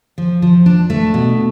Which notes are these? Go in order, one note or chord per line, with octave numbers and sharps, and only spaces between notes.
F3
F3
D4
A3
B2